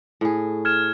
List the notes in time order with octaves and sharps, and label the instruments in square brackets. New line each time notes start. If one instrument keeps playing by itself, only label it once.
[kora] A2 G#4
[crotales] F6 G#6 E7